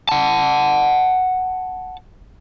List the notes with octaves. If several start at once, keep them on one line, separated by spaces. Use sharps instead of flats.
F#5 A5